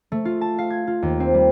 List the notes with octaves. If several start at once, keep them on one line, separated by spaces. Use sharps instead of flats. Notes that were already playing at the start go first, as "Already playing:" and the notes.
A3
F4
A5
F5
G#6
F4
D#2
C4
G3